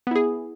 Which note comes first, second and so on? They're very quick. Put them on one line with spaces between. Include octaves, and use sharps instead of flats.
B3 E4 G#4